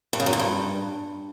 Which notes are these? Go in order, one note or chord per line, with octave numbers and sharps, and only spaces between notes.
G2
C#3
F#2
G#2
G2